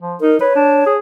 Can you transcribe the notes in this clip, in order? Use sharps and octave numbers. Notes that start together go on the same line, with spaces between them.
F3
D#4 A#4
B4 C#5
D4
G#4